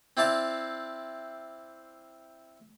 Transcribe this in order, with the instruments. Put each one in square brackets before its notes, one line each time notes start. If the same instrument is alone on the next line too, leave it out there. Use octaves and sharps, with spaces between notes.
[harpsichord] C4 E4 D5 F5 A5